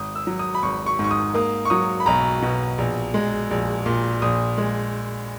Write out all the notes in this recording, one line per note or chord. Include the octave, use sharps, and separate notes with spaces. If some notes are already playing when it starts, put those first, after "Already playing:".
Already playing: G#1 D#6
E6
F#3
D#6
B5
G#1 C#6
C#6
G#2
C#6
D#6
A#3 D#6
C#6
F#3 D#6
B5
B1 A#5
B2
A#1
G#3
A#1
A#2
A#1 D#6
G#3